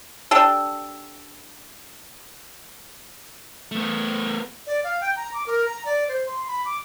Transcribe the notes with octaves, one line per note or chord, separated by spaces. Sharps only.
D4 G4 A4
A3 B3
D5
F5
G5
A#5
D6
A#4
A#5
D5
C5
C6
B5
D6